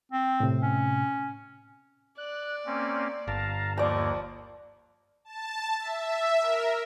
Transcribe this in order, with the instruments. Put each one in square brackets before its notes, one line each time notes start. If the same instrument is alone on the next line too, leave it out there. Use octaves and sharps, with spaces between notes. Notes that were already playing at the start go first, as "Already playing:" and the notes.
[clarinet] C4
[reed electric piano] A2 C3
[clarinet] C#4
[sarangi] D5 [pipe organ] F#6
[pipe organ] A#3 C4 C#4
[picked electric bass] G1 [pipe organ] F5 A5 A#5
[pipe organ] D#2 A#3 [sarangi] F3 [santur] D5 A#5
[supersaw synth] A5
E5
A#4